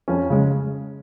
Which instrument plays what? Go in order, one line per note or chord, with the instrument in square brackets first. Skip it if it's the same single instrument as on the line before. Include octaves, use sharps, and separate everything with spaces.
[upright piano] F2 C#4
C#3 G#3